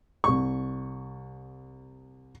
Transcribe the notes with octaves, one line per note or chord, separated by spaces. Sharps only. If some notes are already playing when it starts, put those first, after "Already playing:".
C2 C#6